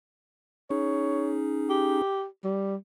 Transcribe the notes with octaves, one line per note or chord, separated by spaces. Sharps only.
C#4 D#4 G#4 C#5
G4
G3